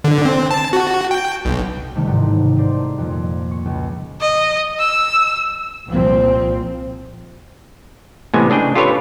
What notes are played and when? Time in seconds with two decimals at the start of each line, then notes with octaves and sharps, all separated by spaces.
0.04 D3
0.25 C4
0.51 A5
0.73 F#4
1.11 G5
1.45 B1
1.95 C3 D#3 G3 A3
2.07 A1 G#2 C3 D#3
2.56 A3 A#4 C5 D5
2.98 F2 A#2
3.51 C#6
3.66 C#2
4.21 D#5
4.79 E6
5.89 C2 A#2 F3 C4
8.34 A2 C3 E3 G#3 B3 G#5
8.50 C#3 D4 G#4 G5
8.75 F4 G4 A4 B4 C#5